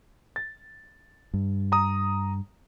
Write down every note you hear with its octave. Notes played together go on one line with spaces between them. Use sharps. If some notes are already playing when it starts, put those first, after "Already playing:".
A6
G2
A#5 D#6